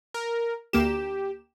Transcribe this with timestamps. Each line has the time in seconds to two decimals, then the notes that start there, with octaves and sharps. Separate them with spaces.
0.14 A#4
0.73 D2 A#3 G4 E7